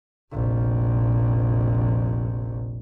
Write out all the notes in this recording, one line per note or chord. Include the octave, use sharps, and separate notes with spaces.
F1 A#1